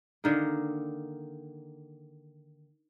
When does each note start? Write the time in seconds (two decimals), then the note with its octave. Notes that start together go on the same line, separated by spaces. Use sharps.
0.24 D3 D#3 A#3